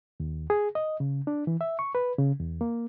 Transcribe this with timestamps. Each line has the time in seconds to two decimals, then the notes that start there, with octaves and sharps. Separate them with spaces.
0.20 D#2
0.50 G#4
0.75 D#5
1.00 C#3
1.27 D4
1.47 E3
1.61 E5
1.79 C#6
1.95 B4
2.18 C#3
2.40 E2
2.61 A#3